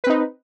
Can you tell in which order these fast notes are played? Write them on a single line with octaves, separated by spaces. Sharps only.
B4 C4 D#4